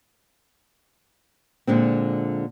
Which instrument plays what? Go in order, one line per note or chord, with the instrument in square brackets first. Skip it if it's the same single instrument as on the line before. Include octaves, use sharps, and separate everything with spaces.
[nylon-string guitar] A#2 D3 G#3 C4